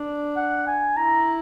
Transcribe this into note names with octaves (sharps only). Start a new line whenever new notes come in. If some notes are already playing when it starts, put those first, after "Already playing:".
Already playing: D4
F#5
G#5
E4 A#5